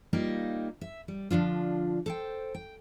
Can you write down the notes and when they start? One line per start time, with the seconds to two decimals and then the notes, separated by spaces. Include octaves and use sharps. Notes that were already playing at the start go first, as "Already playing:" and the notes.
0.13 G3 A#3 D#4 F4 G4
0.81 E5
1.08 G3
1.31 D3 F3 D4 F4
2.06 A4 C5 G5
2.55 G5